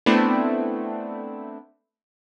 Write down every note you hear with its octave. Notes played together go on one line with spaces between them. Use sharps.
A3 B3 C4 D4 E4